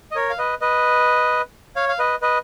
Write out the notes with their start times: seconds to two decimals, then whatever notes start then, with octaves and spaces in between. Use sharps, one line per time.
0.11 D#5
0.15 A#4 C#5
0.30 F5
0.38 B4 D#5
0.61 B4 D#5
1.76 C#5 F5
1.89 F5
1.99 B4 D#5
2.22 B4 D#5